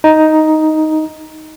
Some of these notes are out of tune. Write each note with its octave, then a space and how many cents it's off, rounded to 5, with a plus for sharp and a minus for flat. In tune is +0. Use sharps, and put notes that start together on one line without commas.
D#4 +5